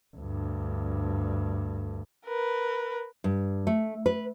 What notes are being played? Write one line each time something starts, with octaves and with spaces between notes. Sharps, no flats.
D2 G2
A#4 B4
G2
A3
B4